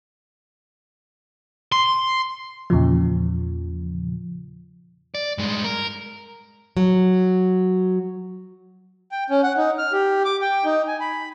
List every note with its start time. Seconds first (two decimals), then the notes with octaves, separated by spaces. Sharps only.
1.72 C6
2.70 E2 A#2 C#3 F3
5.15 D5
5.38 G2 G#3
5.64 A#4
6.77 F#3
9.12 G5
9.30 C#4
9.43 F#5
9.57 D#4
9.78 F6
9.92 G4
10.25 D6
10.41 G5
10.65 D#4
10.88 G#5
11.00 B5